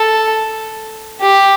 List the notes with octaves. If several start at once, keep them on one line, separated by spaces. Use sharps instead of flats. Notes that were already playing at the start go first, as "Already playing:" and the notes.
Already playing: A4
G4